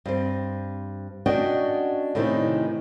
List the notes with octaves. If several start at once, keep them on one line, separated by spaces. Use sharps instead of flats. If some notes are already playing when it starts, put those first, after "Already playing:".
G2 C4
C#4 D4 F#4 D#5 G5
A2 C3 D#3 E3